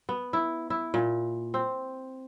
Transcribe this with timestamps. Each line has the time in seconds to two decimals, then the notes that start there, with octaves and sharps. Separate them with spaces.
0.09 B3
0.33 E4
0.70 E4
0.94 A#2
1.54 C4